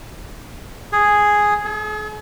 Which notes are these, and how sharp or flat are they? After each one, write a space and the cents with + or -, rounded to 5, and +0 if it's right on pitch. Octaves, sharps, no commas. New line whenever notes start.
G#4 +0
G#4 +45